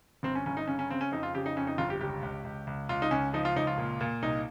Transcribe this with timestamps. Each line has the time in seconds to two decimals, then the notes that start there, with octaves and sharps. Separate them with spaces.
0.23 G1 C4
0.35 C#4
0.46 G1 C#4
0.57 D#4
0.67 C#3 C#4
0.79 C#4
0.90 C#3 C4
1.01 C#4
1.12 F2 D#4
1.23 F4
1.35 C#3 G4
1.46 D#4
1.56 F2 C#4
1.67 D#4
1.78 G1 F4
1.90 G4
2.00 C#2 G4
2.22 C#2
2.45 C#2
2.67 C#2
2.89 C#2 F4
3.02 D#4
3.11 C#2 C#4
3.33 F3 D#4
3.45 F4
3.56 C#2 D#4
3.67 F4
3.78 A#2
4.01 A#2
4.22 C2 D#4